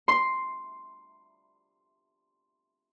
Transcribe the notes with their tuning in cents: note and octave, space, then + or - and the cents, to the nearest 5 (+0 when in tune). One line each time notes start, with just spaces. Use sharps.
C6 +0